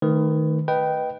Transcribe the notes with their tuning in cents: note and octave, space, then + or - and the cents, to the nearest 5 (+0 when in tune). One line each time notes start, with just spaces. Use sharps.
D#3 +0 A3 +0 B4 +25
B4 +0 D#5 +0 G5 -10